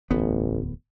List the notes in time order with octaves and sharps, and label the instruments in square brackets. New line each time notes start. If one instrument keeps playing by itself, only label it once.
[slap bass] D1 E2 B3 [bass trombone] A1